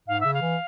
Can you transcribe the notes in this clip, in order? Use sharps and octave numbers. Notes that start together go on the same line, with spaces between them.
G#2 F5
C#3 E5
F5
E3